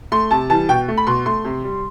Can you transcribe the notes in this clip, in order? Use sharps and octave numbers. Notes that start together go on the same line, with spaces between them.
A3 C6
C3 A5
E3 G3 A5
B2 G5
A3
B5
B2 C6
A3 C6
C3
G3